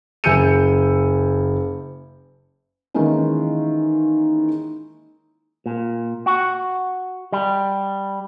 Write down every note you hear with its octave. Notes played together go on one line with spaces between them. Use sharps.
F#1 G#5 E6 G6 C#7 D#7
D#3 E3 G#3 A#3 C#4 E4
A#2
F#4
G3